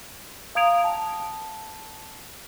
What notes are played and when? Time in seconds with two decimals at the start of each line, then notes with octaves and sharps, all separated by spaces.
0.55 F5 A#5 D#6 G#6 D7 F7
0.84 G5 A5